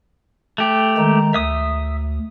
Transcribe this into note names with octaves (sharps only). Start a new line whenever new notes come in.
A3 G4
D#3 G#3 A#5
D2 E5 D#6